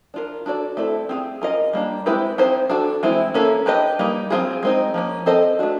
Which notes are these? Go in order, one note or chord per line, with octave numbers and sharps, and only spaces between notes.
D4 F4 A#4
D4 F#4 A4 D5
A3 C4 E4 A4 D5
C4 F4 G#4
C#4 F4 A#4 D#5
G3 A#3 D4
G#3 C4 E4 G4 B4
C4 D#4 G4 C5
D4 F#4 A4
E3 G#3 C4 E4
A#3 C#4 E4 A4
D4 G4 B4 D#5
G3 A#3 D#4
F#3 A3 C4 F4 G#4
G#3 C4 D#4
F3 A#3 C#4
C4 F4 A4 C5 D#5
A3 D4 F#4